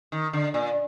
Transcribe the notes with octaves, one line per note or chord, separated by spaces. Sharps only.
D#3
D3
A#2